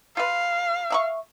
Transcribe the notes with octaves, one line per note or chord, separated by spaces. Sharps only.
F4 B4 F5
E5 B5 C#6